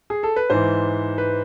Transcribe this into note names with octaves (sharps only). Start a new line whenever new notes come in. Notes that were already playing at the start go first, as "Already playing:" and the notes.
G#4
A4
B4
G#2 E3 C5
B4